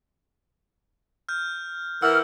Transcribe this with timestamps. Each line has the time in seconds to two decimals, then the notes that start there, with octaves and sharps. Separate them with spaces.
1.29 F6 G6
2.02 E3 A#4 F#5 E6 F6